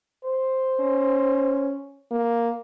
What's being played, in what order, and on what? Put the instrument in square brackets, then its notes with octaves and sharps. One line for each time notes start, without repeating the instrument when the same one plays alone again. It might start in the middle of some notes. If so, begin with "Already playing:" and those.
[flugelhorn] C5
[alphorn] C#4
A#3